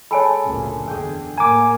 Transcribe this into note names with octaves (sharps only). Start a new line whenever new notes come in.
G#3 G#4 A4 C#5 G#5 B5
F#1 D2 A#2
E2 D3 G#4 G5
A2 A#3 G#5 A#5 D6